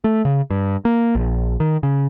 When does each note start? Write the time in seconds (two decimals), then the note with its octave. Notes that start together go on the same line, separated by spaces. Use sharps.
0.04 A3
0.25 C#3
0.50 G2
0.85 A#3
1.15 A#1
1.60 D#3
1.83 C#3